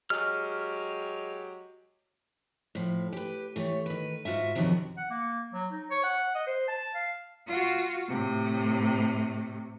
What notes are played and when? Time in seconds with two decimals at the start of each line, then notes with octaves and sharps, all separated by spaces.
0.10 F#3 G#3 G4 F6
2.75 A2 F3
3.12 G4 B4
3.56 E3 A3 G4 C#5
3.86 D#3 B4
4.25 G#2 F4 F#4 E5
4.55 F#2 C3 D#3 F3 F#3
4.97 F#5
5.10 A#3
5.53 F#3
5.72 D#4
5.90 C#5
6.03 F#5
6.35 D#5
6.47 C5
6.68 A5
6.95 F5
7.47 F4 F#4
8.08 A2 C3